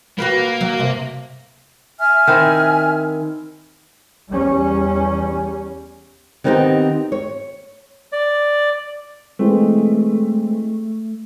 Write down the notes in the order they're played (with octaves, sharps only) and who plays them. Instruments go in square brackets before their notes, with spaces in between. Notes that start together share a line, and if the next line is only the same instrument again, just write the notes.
[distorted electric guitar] A#3 [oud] F#4 G4 B4
[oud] F#3
G2 C3
[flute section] E5 G#5 F6
[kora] D#3 C4 E4
[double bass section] E2 G3 C#4
[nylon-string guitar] D#3 B3 C4 D#4 F4 G4
C#5
[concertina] D5
[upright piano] E3 G#3 C4 [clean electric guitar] A3